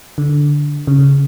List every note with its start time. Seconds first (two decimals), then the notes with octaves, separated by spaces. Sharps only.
0.18 D3
0.87 C#3